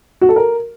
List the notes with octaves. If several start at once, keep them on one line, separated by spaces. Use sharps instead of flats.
F#4
A4
A#4